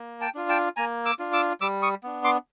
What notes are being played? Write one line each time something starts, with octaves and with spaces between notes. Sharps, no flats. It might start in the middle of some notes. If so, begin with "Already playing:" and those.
Already playing: A#3
G5 A5
D4 F4
G5 A5
A#3 G#5 A#5
D6 E6
D4 F4
D6 E6
G3 D6 E6
C#6 D#6
B3 D4
C6 D6